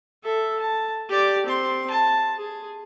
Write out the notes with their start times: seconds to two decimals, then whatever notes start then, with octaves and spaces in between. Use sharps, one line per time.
0.23 A4 E5
0.60 A5
1.09 G4 D5
1.47 C4 C6
1.90 A5
2.38 G#4